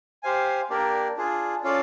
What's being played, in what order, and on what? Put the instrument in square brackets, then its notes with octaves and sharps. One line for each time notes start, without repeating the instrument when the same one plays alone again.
[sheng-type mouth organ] G4 C5 F5 G#5
A#3 D4 G4 A#4 D5
D4 F4 G#4
C#4 F4 A4 D5 F5